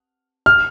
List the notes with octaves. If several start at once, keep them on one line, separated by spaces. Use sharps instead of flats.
F6